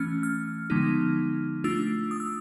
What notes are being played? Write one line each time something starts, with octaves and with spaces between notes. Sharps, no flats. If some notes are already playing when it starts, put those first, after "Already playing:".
Already playing: E3 A3 C#4 F6
F6
D3 F3 G#3 B3 D#4
A3 D4 F4 E6
D#6
E6